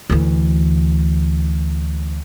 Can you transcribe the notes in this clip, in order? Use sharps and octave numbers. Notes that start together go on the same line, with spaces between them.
D2 E3